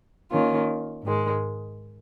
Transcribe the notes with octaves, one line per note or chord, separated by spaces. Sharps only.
D#3 A#3 C#4 F4
G#2 D#3 G#3